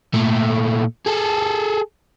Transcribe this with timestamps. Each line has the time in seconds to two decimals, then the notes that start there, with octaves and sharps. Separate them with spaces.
0.14 A#2 A3
1.06 G#4 A4